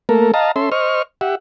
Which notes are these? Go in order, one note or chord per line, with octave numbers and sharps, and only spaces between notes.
A3 A#3 A4 A#4
D#5 F5 A5 A#5
C#4 A4 E5 C6
C5 D#5 C#6 F6
G4 E5 F#5